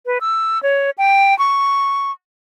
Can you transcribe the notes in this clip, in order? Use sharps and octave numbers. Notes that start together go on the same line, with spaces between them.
B4
E6
C#5
G5
C#6